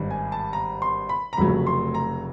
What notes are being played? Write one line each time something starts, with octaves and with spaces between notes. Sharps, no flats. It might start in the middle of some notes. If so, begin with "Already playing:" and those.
Already playing: G#1 G2 D#3
G#5
A5
A#5
C6
B5
A#5
F1 F2 C#3 F#3 A3 B5
C6
A#5